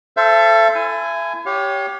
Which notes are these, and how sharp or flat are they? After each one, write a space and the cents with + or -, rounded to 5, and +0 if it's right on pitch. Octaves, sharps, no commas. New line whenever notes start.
A4 +0 C5 +0 E5 +40
E4 +35 G#5 +0
G4 +0 C#5 +15 F5 +45